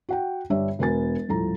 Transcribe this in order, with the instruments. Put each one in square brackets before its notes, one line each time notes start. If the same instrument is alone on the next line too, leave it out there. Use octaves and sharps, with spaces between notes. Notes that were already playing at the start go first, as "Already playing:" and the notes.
[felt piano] F#4 F#5 G5
G1 G3 D4 C#5 E5
E1 B3 F#4 A#4 G#5 A6
D#1 A2 F3 F4 A4 A#5